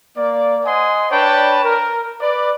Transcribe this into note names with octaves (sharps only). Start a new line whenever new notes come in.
A#3 D5
C5 D#5 F#5 G#5 C6 D#6
D4 B4 C#5 D5 G5 A5
A#4
B4 D5